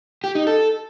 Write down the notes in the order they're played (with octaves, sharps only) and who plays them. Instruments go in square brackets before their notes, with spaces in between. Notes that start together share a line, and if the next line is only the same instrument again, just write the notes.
[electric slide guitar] G4
D#4
A4